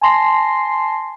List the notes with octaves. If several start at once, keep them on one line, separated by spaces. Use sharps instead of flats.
G#5 A5 C6 A#6 C7